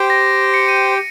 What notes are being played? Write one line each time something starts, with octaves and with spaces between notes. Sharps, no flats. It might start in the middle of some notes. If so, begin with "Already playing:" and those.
Already playing: G4 C5 G5
A#6
C#7
D#7